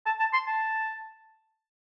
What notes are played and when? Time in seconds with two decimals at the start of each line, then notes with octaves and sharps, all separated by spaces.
0.06 A5
0.20 A5
0.33 C6
0.47 A5